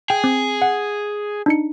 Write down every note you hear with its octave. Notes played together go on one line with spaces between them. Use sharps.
G#4 G5
C4
F#5
D4 D#4 C#7